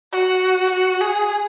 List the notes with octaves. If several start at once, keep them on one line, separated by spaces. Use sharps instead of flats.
F#4
F#4
G#4